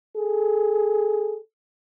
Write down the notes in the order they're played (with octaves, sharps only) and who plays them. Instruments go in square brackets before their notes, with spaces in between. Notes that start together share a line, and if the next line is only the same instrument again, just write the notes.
[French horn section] G#4 A4